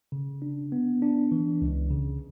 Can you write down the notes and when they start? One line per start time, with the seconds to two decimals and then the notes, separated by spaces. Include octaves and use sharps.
0.12 C#3
0.42 D4
0.72 B3
1.02 D4
1.32 E3
1.62 C#2
1.91 C#3